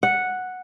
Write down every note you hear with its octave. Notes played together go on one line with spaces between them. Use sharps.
F#5